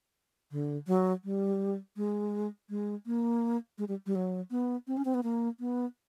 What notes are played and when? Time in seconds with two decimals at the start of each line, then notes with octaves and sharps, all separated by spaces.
0.52 D3
0.87 F#3
1.24 G3
1.96 G#3
2.69 G#3
3.06 A#3
3.78 G#3
3.88 G3
4.06 G3
4.15 F#3
4.51 B3
4.87 C4
4.97 C#4
5.05 C4
5.14 B3
5.23 A#3
5.60 B3